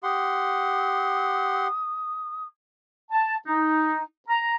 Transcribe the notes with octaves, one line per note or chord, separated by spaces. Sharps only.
G4 F#5 C6 D#6
A5
D#4
A#5